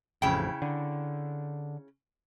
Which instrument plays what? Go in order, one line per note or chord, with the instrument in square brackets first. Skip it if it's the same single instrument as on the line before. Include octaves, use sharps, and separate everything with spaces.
[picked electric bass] A1 F2 [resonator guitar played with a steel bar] C#3 E4 G5
[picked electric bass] D3